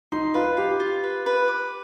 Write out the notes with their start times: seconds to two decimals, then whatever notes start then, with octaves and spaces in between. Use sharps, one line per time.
0.12 D#4 C6
0.34 F4 B4
0.57 G4 F5
0.80 F4
1.03 B4
1.26 B4
1.48 D6